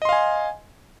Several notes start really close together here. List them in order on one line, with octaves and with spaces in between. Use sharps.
D#5 C6 F5 G#5